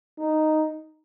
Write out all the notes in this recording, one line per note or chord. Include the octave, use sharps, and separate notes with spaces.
D#4